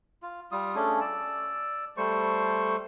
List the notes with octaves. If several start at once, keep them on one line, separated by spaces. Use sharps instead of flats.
F4
G3 F4 D#6
A3 C#4 D4 G#4
D5 E6
G3 A3 C5 C#6